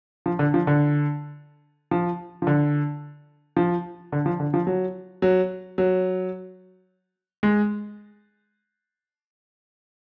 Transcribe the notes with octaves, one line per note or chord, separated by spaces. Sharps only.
F3
D3
F3
D3
F3
F3
D3
F3
D3
F3
D3
F3
F#3
F#3
F#3
G#3